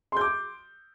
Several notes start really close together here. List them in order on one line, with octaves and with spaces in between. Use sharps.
C6 G6 D6